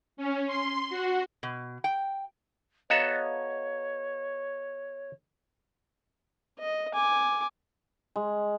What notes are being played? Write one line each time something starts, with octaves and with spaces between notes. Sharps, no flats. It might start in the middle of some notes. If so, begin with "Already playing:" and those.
C#4
C6
F#4
B2
G5
B3 F#4 A4 C#5 D#5 F5 A#5
D#5
G#5 D6
G#3